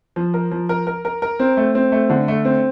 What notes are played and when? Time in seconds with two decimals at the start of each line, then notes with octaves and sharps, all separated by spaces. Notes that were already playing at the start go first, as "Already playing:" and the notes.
0.16 F3
0.34 A#4
0.51 F3
0.69 A#4
0.87 A#4
1.05 A#4
1.22 A#4
1.40 C4
1.57 A3
1.75 C4
1.92 A3
2.10 D3
2.28 A3
2.45 C4